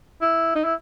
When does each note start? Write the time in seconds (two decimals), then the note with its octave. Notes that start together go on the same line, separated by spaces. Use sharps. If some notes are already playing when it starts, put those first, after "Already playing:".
0.22 E4
0.55 D#4
0.64 E4